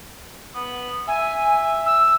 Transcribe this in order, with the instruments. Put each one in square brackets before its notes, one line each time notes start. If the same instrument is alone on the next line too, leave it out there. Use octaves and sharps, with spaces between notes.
[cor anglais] B3
[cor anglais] E5 [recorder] G#5
[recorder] E6